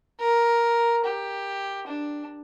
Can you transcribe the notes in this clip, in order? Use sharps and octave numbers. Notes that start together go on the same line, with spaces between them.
A#4
G4
D4